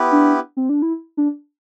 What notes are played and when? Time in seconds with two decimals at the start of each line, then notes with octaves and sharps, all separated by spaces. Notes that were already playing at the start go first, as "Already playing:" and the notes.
Already playing: B3 E4 G4 B4
0.12 D4
0.57 C4
0.69 D4
0.82 E4
1.17 D4